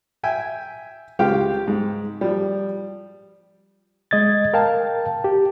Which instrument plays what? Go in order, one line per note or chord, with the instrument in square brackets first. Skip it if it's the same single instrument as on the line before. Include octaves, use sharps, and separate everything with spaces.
[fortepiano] E5 G5 G#5
C#2 G#3 G4 F5 G5
G#2
F3 G3
[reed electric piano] G#3 D#5 G#6 A6
A#4 F5 G5 A5
G4